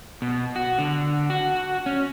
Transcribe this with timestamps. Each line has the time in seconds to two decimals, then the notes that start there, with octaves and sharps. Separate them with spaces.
0.22 B2
0.56 F#4
0.79 D3
1.30 F#4
1.86 C#4